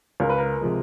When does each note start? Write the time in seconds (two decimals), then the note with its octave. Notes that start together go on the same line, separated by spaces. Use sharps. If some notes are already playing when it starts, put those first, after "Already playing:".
0.20 C#2 A#4
0.29 B4
0.38 A#4
0.61 C3 F3 G#3